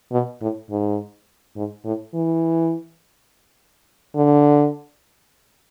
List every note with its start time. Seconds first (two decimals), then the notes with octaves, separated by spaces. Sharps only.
0.12 B2
0.41 A2
0.71 G#2
1.56 G#2
1.85 A2
2.14 E3
4.15 D3